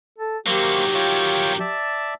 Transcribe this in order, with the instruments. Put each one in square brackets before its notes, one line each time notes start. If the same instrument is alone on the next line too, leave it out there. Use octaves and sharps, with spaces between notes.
[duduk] A4
[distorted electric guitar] D#3 F#3 [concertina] A#3 C5 C#6 [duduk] G4
[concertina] F4 C#5 G5
D5 E5 A5